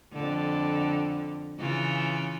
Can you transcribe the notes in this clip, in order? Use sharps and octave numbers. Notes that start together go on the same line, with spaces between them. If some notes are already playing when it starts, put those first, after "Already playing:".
F2 D3
C#3 E3 F4